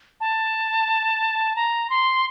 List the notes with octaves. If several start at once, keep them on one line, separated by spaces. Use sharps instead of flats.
A5
A#5
C6